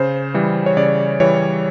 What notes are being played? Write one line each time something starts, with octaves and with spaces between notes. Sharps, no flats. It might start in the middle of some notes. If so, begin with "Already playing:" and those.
Already playing: C#3 C5
E3 G3
C#5
C#3 D5
E3 G3 C#5